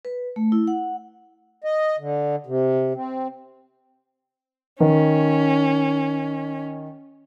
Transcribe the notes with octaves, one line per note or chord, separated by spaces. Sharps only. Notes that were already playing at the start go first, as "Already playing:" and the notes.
B4
A3
E4
F#5
D#5
D3
C3
C4
D#3 C#4